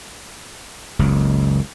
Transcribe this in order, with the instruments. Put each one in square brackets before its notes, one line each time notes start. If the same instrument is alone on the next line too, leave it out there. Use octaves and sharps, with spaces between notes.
[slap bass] F#1 C#2